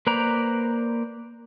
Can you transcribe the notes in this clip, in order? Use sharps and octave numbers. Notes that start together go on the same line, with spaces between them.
A#3 B4 C5 D5 A#5